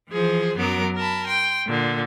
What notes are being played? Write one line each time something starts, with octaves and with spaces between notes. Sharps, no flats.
E3 F3 G#4 C5
F#2 F#3 B3 A#4 D6
A#4 A5 B5
G5 C6
A#2 D3